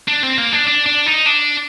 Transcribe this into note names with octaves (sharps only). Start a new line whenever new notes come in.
D4
C4
A#3
D4
D4
D4
D#4
D4